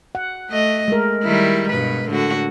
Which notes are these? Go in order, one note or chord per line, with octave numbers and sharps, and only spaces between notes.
F#5
A3 D#5
G#3 A3 A#4
D#3 G3 E4
G2 B2 B4
A2 D3 F#4